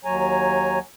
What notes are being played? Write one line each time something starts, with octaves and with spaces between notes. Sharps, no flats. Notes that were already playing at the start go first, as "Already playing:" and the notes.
D#2 F#3 C#5 G#5 A#5